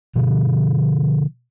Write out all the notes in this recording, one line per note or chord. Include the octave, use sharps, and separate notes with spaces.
B2 D3 F3